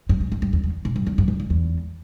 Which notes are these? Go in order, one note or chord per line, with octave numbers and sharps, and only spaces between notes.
G2
G#2
G2
G2
E2
E2
A#2
G2
E2
G2
E2
G2
E2